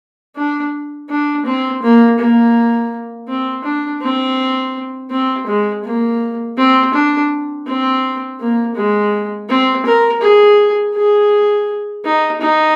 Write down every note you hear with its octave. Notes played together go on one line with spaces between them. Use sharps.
D4
D4
C4
A#3
A#3
C4
D4
C4
C4
G#3
A#3
C4
D4
C4
A#3
G#3
C4
A#4
G#4
G#4
D#4
D#4